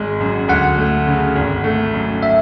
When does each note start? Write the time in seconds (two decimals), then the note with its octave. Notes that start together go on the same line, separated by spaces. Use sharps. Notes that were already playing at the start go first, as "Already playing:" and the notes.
Already playing: G#1 G#3
0.21 F#2
0.48 D2 F#5
0.78 A3
1.07 C#3
1.36 G#1
1.64 A3
1.94 F#2
2.23 E5